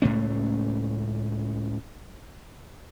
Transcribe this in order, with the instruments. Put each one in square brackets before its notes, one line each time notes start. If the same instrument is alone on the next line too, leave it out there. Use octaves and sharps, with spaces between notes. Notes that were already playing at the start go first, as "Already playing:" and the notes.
[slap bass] C#2 A2 A3 C#4